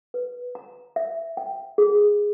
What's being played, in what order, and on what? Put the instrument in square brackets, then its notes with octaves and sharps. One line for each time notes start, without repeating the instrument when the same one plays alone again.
[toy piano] B4
A#5
E5
G5
G#4